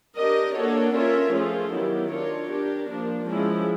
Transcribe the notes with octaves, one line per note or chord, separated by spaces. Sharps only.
D4 G4 A#4 D#5
A#3 D4 F#4 A4 C#5
C#4 F4 A#4 C#5 E5
F3 A3 C#4 F4 G#4
D#3 F#3 B3 E4 G4
D4 F4 A#4 C#5
D4 G4 A#4
F3 A#3 D4
F3 G#3 C#4 E4